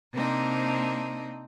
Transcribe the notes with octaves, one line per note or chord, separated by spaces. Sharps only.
C3 A#3 C4 D4 D#4